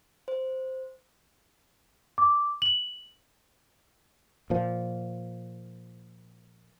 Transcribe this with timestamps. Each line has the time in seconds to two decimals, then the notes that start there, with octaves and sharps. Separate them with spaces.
0.28 C5
2.18 D6
2.62 F#7
4.50 A#2 F3